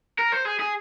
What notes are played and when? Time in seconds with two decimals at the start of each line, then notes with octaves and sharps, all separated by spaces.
0.19 A#4
0.32 C5
0.46 G#4
0.60 G#4